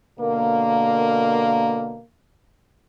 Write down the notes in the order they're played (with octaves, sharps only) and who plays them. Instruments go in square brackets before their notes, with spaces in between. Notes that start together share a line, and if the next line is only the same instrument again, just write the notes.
[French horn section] B2 D3 A#3